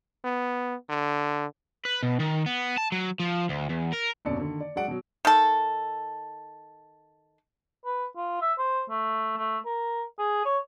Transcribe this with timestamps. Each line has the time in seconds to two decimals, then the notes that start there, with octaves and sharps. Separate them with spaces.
0.25 B3
0.90 D3
1.85 B4
2.03 B2
2.20 D#3
2.46 B3
2.78 A5
2.92 F#3
3.20 F3
3.49 D2
3.69 E2
3.92 A#4
4.25 D#1 F#2 B2 D3 D5 C#7
4.39 D3 D#3
4.61 D5
4.76 F#3 G#3 F#4 D5 F#5 D7
4.88 B2 F#3
5.25 D#3 A4
7.85 B4
8.17 F4
8.42 E5
8.59 C5
8.90 A3
9.37 A3
9.65 A#4
10.19 G#4
10.45 C#5